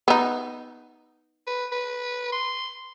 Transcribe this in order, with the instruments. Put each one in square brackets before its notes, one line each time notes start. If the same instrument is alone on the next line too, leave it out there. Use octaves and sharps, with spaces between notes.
[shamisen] B3 D#4
[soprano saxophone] B4
B4
C6